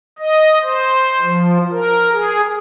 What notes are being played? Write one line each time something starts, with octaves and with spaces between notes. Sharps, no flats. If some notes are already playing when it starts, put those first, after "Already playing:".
D#5
C5
F3
A#4
G#4